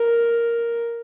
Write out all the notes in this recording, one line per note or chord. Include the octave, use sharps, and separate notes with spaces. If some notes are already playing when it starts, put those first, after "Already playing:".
Already playing: A#4